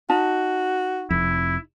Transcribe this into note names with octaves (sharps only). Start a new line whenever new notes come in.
D#4 F#4 A5
F1 F2 E4